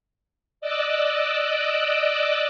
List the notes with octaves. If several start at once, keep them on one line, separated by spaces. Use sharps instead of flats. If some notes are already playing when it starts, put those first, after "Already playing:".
D5 D#5 D6 E6 F#6